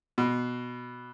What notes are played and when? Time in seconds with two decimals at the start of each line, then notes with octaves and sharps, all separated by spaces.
0.18 B2